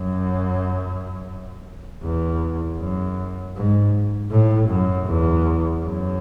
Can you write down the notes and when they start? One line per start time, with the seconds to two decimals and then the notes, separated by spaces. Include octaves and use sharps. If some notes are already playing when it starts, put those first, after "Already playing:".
Already playing: F#2
2.03 E2
2.79 F#2
3.56 G#2
4.31 A2
4.69 F#2
5.08 E2
5.84 F#2